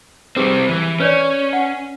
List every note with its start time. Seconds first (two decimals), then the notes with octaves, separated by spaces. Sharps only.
0.36 G3 C4 G4 G#4 B4
0.69 E3
1.00 C#4 B4 C#5 D5
1.53 F#5